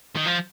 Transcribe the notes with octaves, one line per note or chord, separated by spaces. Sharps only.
D#3
F3